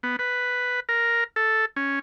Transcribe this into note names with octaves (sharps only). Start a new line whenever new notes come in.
B3
B4
A#4
A4
C#4